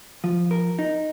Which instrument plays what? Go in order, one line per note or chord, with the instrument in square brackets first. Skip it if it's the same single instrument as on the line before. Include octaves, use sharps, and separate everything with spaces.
[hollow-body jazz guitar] F3
A#4
D#4